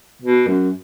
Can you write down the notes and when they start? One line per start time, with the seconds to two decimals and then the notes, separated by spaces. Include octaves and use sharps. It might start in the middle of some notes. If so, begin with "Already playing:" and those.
0.22 B2
0.47 F#2